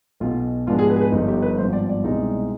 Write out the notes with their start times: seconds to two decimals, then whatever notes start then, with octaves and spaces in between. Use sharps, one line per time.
0.20 B1 B2 B3 F4
0.67 G#2 F3 G#3 B3 D4 F4
0.79 G#4
0.90 B4
0.96 G#4
1.01 B4
1.12 G1 G2 F3 B3 D#4
1.28 G4
1.42 B4
1.58 G#1 G2 F3 B3 C5
1.73 D5
1.89 D5
2.04 C2 B2 G#3 C4 D#4